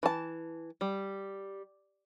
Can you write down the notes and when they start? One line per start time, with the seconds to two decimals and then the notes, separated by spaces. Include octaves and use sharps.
0.03 E3 A5
0.81 G3